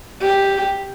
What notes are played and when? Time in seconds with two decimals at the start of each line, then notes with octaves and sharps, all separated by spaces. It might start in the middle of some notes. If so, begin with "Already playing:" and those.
0.21 G4